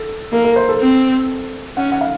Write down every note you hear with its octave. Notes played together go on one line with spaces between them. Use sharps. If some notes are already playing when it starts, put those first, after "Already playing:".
Already playing: A4
A#3 A#4
A#4
C5
A4
C4
C#4 F#5
F#5
F5